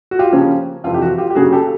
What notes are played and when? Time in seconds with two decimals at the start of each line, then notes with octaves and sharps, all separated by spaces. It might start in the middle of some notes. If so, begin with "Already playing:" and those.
0.11 F#4
0.19 F4 G4
0.32 C#3 F3 A#3 C#4
0.84 F2 C3 E3 F4
0.94 G4
1.02 F#4
1.18 F4 G4
1.30 G4
1.35 C#3 F#3 A#3 C#4 F#4 G#4
1.53 G4 A4